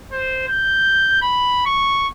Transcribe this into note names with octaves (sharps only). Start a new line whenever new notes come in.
C5
G6
B5
C#6